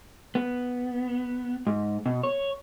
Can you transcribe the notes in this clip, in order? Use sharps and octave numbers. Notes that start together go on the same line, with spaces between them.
B3
G#2
B2
C#5